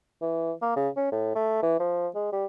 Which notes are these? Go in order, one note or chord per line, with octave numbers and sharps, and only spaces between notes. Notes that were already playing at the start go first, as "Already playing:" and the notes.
E3
A#3
C#3
C#4
A2
A3
E3
F3
G#3
G3